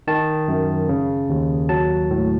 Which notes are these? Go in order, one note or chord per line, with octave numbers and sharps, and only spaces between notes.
D#3 A5
F#2
C#3
D#2
F#3 A5
A2